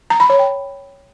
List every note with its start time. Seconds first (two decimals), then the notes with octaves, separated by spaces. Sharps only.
0.10 A#5
0.20 B5
0.30 C#5
0.39 G5